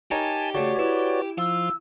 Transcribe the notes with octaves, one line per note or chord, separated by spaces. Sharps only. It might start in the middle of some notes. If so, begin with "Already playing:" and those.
D#4 G4 A#4 C#5 G#5 A5
C#3 A3 F#4 C#5 D5
E4 B4 G#5
F3 F4 E6